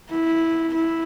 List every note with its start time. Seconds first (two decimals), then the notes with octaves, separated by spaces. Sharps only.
0.10 E4
0.74 E4